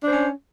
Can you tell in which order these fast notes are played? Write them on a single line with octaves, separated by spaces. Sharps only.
D4 C5 C#4